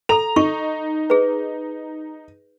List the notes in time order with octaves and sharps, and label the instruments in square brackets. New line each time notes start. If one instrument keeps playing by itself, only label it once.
[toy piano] A4 [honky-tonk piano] A#5 F7
[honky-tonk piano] D#4 [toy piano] C#6
[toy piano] G#4 B4